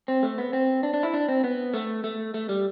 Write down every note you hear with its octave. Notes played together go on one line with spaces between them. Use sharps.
C4
A3
B3
C4
D4
D4
E4
D4
C4
B3
A3
A3
A3
G3